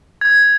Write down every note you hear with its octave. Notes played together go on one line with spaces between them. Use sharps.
G#6